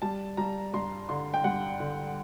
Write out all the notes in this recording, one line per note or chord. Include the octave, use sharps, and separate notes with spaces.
G3 A5
G3 A#5
G2 C6
D3 C6
G5
G2 F#5
D3